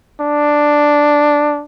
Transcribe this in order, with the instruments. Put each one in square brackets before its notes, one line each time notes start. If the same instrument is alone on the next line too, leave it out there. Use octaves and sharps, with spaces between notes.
[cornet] D4